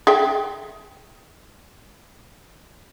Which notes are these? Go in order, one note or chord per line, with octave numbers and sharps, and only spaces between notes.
G#4 E5 G5